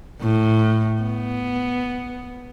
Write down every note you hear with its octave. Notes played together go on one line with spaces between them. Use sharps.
A2
B3